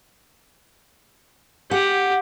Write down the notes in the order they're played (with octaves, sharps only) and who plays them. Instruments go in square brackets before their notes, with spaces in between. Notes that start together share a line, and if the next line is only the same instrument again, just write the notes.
[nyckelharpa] G4 [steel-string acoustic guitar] F#5